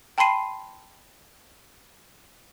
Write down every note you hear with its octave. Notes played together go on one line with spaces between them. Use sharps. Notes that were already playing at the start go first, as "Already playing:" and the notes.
G5 A5 B5 C6 C7 D#7